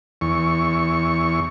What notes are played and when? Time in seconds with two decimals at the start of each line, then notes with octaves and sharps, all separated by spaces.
0.21 E2 C#6